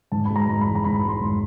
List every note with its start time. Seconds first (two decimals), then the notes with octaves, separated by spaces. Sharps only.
0.12 G#2 A5
0.25 G#3 B5
0.36 A#5
0.48 G#2 A#5
0.61 B5
0.66 E3
0.75 A#5
0.84 G#2 B5
1.04 G#3
1.09 C6
1.21 G#2